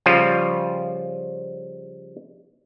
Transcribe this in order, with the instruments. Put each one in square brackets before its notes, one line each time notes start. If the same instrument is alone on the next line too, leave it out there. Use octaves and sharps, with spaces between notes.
[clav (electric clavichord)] C#3 F3 G3 F4